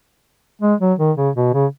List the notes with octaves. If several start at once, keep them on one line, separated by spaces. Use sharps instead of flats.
G#3
F#3
D#3
C#3
B2
C#3